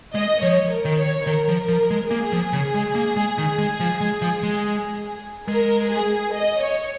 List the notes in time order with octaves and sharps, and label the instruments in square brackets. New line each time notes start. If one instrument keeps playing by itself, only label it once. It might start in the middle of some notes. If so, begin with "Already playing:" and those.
[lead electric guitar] G#3 [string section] D#5
[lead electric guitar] F3 [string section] C#5
[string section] A#4
[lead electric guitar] D#3
[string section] C#5
[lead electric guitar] D#3 [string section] A#4
[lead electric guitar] F3
F3
G#3
[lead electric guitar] A#3 [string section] G#4
[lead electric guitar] F3
C#3
G#3
A#3
G#3
D#3
G#3
F3
G#3
F3
G#3
[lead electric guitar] G#3 [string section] A#4
[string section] G#4
D#5
C#5